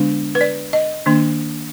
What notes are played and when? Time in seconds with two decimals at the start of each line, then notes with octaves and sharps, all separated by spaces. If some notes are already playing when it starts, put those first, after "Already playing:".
Already playing: D3 G#3 B3 D4
0.35 B4
0.41 D5
0.73 D#5
1.06 D#3 A#3 D4